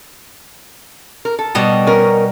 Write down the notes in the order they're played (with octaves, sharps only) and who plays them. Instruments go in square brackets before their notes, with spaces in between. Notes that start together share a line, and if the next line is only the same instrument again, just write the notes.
[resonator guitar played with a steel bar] A#4
A4
[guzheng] B2 G3 D#5
[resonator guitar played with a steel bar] C#4 A#4